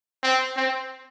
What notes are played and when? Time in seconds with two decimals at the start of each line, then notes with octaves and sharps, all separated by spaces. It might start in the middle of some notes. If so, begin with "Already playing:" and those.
0.23 C4
0.56 C4